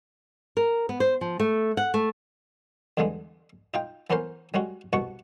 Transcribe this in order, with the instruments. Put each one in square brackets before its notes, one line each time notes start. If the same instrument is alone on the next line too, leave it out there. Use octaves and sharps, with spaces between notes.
[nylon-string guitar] A#4
B3
C5
F3
A3
F#5
A3
[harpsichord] E2 G2 D3 E3 G#3
D#4 F4 G5
E3 B3 C#4 A#4 C5
G3 G#3 C#4 F#4
C2 B2 F#4 F#5 C#6